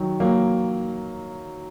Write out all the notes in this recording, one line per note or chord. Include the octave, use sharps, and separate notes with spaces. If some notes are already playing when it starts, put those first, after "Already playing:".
Already playing: D#3 F#3
F#3 A#3